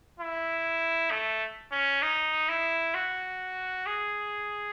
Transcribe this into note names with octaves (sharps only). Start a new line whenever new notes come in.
E4
A3
C#4
D#4
E4
F#4
G#4